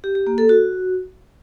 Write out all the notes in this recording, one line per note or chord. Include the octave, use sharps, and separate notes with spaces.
G4
G4
A#3
A4
F#4